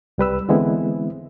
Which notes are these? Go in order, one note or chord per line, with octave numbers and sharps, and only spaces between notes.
C2 G3 B4 E6
D3 E3 G#3 B3 C4 E4